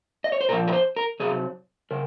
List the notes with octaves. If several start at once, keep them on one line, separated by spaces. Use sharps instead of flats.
D#5
C#5
C5
A#2 F3 A#4
A#4
C5
A#4
C3 F#3 G#4
C#3 A#4